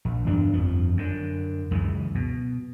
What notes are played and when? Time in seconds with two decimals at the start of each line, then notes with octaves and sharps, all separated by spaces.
0.05 A#1
0.27 E2 G2 D4
0.53 G1 F2 F3
0.97 F#2 D3
1.71 C#2 F#2 C#3 E3
2.15 B2